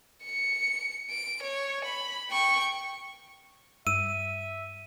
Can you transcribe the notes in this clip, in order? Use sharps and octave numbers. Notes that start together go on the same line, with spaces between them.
C#7
D7
C#5
B5
G5 C#6
G2 E5 E6 D#7